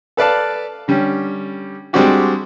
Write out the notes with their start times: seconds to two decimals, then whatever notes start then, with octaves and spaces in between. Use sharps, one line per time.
0.17 A4 B4 D5 F5 A5
0.88 D3 G3 C#4
1.93 G3 G#3 C4 D4 F#4 G4